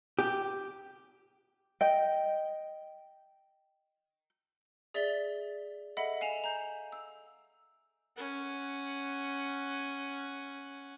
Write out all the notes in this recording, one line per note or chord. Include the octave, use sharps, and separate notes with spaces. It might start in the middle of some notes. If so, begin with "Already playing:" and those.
G4
D#5 G5
G#4 D5 E5 A6 B6 G7
A4 D#5 E5 F#5 B5
F5 G#5 E7 F7
A#5 G6
E6
C#4 F#5